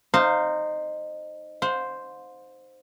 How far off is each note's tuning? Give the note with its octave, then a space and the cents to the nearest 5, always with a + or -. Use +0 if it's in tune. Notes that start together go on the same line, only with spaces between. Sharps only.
D#4 -20 C5 +0 F5 +0
C5 +0 F5 +45